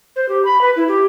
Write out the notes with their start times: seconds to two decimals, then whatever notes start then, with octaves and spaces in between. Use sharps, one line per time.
0.16 C5
0.29 G4
0.45 B5
0.61 B4
0.76 E4
0.88 G4